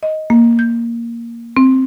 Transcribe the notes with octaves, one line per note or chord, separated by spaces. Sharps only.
D#5
A#3
G6
C4